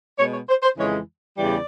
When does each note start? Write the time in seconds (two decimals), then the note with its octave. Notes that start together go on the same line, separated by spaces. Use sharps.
0.19 B2 G#3 C#5
0.33 C#5
0.49 C5
0.63 C5
0.77 F2 C#3 E3 G#3 C#5
1.37 E2 C#3 E3 G3 D5